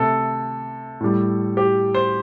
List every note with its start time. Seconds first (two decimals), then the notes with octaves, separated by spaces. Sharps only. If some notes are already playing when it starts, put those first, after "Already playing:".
Already playing: C3 A3 A4
1.01 A2 G3
1.57 G4
1.94 C5